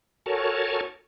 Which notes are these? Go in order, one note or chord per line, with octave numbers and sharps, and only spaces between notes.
F#4 A4 A#4 C#5 G#5 A5